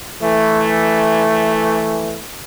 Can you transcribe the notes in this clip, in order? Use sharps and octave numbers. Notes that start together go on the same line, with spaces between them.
E3 A3